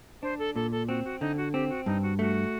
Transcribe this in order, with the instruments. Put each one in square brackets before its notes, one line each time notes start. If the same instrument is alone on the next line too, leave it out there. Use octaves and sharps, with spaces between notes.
[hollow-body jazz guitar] D4 [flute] C5
[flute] A4
[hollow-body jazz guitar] A#2 [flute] A4
[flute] A4
[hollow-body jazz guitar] C4 [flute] F#4
[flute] F#4
[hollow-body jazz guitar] D3 [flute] D#4
[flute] F#4
[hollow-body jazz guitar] C4 [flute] G4
[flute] F#4
[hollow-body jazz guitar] G2 [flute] D#4
[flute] F#4
[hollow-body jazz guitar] A3 [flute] F#4